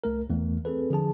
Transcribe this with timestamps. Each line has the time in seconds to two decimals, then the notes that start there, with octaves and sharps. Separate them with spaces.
0.04 C2 A3 A#4
0.30 E2 E3 A3
0.65 C4 G#4 A4 B4
0.90 D3 F3 G#4 A5